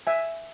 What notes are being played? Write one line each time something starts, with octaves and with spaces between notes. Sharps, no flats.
E5 G#5